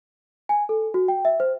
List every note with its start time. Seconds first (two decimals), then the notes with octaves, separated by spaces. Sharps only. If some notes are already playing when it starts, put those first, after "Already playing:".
0.49 G#5
0.69 A4
0.94 F#4
1.08 G5
1.25 E5
1.40 C5